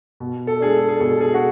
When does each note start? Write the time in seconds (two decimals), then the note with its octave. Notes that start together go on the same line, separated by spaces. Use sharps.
0.20 B2
0.47 A4
0.60 G#3 D4 G#4
0.74 A4
0.89 G#4
1.00 B2 A4
1.21 G#4
1.34 F#4